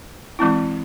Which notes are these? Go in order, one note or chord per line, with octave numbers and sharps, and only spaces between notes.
E3 G#3 C4 E4